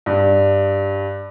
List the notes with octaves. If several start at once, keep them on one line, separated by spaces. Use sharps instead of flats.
G2